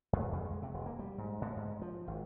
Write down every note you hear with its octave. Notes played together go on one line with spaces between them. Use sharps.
F2
F2
G#3
C3
E1
A#3
G3
G#2
A2
G#2
F3
G#1